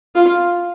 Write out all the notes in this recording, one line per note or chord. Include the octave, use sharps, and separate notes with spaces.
F4